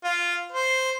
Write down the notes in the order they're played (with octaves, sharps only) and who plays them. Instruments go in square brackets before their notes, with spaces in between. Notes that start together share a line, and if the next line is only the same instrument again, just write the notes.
[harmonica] F4
C5